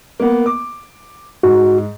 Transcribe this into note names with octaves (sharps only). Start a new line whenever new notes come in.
A#3 B3
D6
G#2 F#4